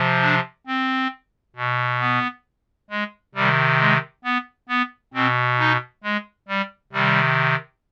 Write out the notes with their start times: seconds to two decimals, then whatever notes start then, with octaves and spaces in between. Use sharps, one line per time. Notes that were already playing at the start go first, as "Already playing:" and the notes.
Already playing: C3 F3
0.21 D4
0.67 C4
1.56 B2
2.01 B3
2.90 G#3
3.35 C3 D#3 G3
3.80 G#3
4.24 B3
4.69 B3
5.14 B2 C4
5.59 D#4
6.04 G#3
6.48 G3
6.93 C3 D#3 G3